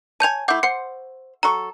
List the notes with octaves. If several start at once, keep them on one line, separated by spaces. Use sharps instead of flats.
C#5 G#5 A5 G6 F7
A3 E4 F#5 D6 G6
C5 F#5 C#7
F#3 A4 A#5 C#6